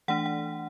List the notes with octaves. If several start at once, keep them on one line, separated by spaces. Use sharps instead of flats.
E3 A3 D4 F#5
F#5